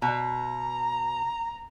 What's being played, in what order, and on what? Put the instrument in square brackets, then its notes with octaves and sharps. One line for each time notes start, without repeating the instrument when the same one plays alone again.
[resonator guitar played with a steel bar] B2 [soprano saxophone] A#5